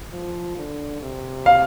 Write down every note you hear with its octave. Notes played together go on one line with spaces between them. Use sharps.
F3
D3
C3
F5